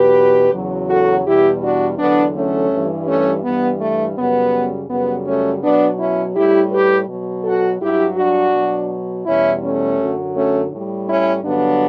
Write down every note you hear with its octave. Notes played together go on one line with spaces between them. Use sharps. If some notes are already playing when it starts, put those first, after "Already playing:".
Already playing: E2 B2 F#3 G4 B4
E2 C#3 F#3
F#4 A4
E2 B2 G3 E4 G4
D4 F#4
E2 D3 F#3 B3 D4
A3 C#4
G2 E3 G3
A3 C#4
G2 E3 G3 B3
A3
F#2 C#3 G3 B3
F#2 C#3 G3 B3
A3 C#4
B2 F#3 B3 D4
C#4 E4
A2 G3 E4 G4
G4 B4
B2 F#3
F#4 A4
G2 F#3 E4 G4
D4 F#4
B2 F#3
E2 B2 G3 C#4 E4
A3 C#4
F#2 D3 F#3
A3 C#4
A2 G3
C#4 E4
G2 D3 F#3 B3 D4